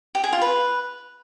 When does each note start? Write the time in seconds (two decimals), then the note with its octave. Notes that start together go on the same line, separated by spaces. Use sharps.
0.15 G4
0.24 G#4
0.33 F4
0.41 B4